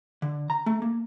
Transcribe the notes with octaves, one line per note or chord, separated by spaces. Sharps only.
D3
A#5
A3
A#3